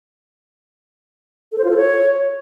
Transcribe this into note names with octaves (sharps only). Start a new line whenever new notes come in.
A4
C5
F4
A4
C#5